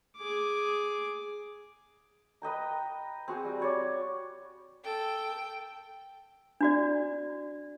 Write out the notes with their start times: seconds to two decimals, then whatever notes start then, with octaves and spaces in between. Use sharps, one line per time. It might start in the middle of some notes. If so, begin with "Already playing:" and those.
0.17 G#4 D6
2.42 B4 D#5 G5 A#5
3.28 C4 F#4 G#4
3.45 G3
3.60 F#4 C#5 D5
4.84 A4 G5
6.61 D4 F#4 D5